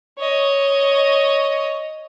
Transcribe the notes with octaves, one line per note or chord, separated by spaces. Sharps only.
C#5 D#5